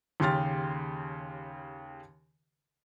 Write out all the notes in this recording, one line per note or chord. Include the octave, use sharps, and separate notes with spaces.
D#2 C#3 G4 C6 F6 A6